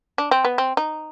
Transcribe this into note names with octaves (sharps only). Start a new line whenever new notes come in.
D4
C4
B3
C4
D#4